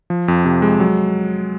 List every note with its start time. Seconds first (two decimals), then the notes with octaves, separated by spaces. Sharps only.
0.10 F3
0.28 F2
0.45 C3
0.62 G#3
0.80 F#3